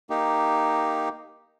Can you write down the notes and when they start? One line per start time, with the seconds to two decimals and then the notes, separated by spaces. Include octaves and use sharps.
0.10 A#3 D#4 G4